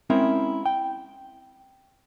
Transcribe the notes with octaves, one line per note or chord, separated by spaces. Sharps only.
G#3 C4 C#4 E4 A#4
G5